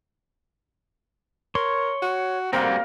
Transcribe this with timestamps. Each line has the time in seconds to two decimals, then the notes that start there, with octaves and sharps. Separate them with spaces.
1.55 A#4 C#5 C6
2.02 F#4
2.53 G3 A#3 C4 F#4 A#4 F5